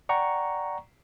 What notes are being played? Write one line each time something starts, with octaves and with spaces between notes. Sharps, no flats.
D5 F#5 G5 A#5 C#6